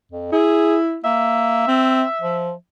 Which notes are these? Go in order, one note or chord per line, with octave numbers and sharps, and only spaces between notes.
F2
E4 G#4
A#3 E5
C4
F3